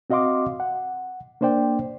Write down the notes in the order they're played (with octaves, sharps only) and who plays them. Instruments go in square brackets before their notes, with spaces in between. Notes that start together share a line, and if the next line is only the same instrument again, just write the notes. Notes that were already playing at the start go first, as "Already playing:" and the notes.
[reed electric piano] C4 F#4 D#5 F5 C6 D6
F#5
A#3 D4 C5 D5 G5